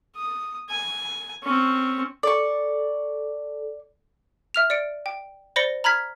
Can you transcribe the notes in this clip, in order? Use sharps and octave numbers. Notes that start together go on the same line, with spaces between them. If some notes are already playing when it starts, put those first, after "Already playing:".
D#6
G#5
C4 C#4
A4 D5 C#6
E5 F6 F7
D5 C#7 D7
G5
C5 D5 B5 A#6 C#7 G7
A#5 B5 F6 G#6 B6